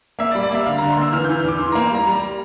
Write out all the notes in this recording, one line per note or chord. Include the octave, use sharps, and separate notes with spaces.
A#3 E5
D5
G3
D5
A#3 E5
D3 F5
D3 A#5
C6
A#3 E6
E3 F6
E3 G6
F6
E2 D6
E3 C6
A#3 A#5
G3 A#5
G3